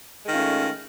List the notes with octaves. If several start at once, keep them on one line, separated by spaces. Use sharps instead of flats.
D#3 G#3 A3 C#4 F4